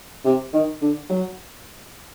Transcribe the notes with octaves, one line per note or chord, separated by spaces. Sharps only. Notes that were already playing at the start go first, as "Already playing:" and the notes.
C3
D#3
D3
F#3